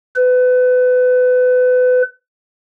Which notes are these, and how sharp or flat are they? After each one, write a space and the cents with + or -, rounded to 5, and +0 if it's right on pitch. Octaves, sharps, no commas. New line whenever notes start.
B4 +30